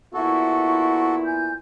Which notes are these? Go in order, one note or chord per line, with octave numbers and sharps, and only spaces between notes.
A#2 B3 E4 F#4 A4 C#6
G#5 G6